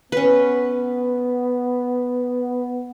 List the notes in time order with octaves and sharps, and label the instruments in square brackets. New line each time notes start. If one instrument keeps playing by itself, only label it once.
[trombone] B3 [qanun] C#4 B4